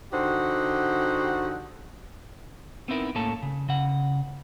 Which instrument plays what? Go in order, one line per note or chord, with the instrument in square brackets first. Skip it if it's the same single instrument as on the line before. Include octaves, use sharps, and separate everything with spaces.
[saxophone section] D3 D#4 F#4 G4 C5
[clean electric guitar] B3 C4 D#4 E4 A#4
A2 A#3 C#4 A4 A5
C#3
C#3 F#5